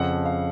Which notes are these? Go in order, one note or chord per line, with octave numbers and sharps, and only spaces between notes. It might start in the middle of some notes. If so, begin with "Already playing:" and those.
Already playing: F2 C#3 F3 F#5
F5